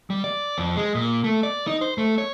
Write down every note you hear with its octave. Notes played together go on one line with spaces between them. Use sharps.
G3
D5
F2
G#3
A#2
A3
D5
D#4
C5
A3
C#5